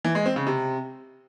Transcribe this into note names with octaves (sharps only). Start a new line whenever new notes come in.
E3
G#3
C4
C#3
C3